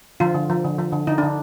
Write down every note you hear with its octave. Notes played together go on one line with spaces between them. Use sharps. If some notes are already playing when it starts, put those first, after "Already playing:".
D3 F3 F4
D3
F3
D3
F3
D3
D3 D#4
D3 D4